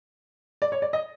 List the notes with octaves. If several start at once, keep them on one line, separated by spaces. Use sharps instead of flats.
D5
C#5
D5
D#5